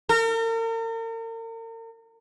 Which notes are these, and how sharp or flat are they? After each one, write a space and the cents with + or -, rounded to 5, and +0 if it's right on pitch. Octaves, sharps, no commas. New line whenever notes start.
A#4 -40